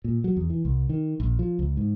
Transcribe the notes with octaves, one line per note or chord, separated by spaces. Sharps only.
A#2
F#3
E2
E3
C2
D#3
A#1
F3
C#2
G#2